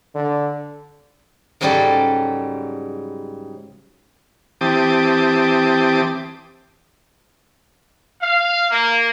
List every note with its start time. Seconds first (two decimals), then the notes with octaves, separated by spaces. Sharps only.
0.15 D3
1.61 G#2 C#3 F#3 G3 G4 A4
4.61 E3 C4 G4 A5 D6 D#6
8.22 F5
8.71 A#3